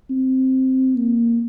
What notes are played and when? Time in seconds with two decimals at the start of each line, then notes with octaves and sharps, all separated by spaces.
0.11 C4
0.96 A#3